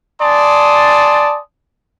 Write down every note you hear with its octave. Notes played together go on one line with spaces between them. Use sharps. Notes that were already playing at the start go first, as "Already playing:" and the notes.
D5 G#5 A5 C6 D#6